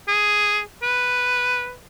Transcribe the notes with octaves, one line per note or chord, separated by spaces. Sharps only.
G#4
B4